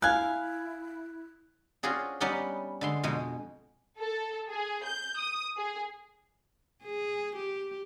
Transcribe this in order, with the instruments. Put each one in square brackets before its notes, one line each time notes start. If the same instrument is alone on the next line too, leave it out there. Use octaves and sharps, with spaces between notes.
[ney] E4 [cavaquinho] F5 G#5 [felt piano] F#6 G#6
[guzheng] C4 C#4 F4 F#4 G#4 D5
G3 B3 C#4 D#4 D5 F#5
D3 G#3 C6
F2 B2 G#3
[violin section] A4
G#4
G6
D#6
G#4
[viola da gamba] G#4
G4